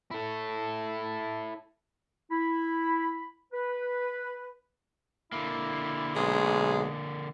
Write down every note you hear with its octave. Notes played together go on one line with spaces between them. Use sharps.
E4 A4
E4 B5
B4
D3 A#3 E4
B1 G#3 G#4